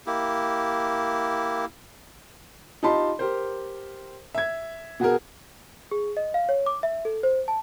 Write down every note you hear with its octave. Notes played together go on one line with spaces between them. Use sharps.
A#3 E4 G4
D#4 F4 G4 A5 B5 C6
G4 A#4 C5
E5 G#6
B2 F#4 G#4 A#4
G#4
D#5
F5
C#5
D6
E5
A4
C5
A5